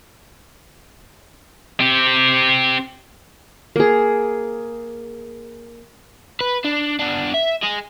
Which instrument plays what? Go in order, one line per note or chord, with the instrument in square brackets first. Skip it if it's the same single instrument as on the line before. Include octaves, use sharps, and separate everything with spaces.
[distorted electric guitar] C4 G4
[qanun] A#3 G#4
[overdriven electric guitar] B4
D4
B3 D4
E5
G#4 D#5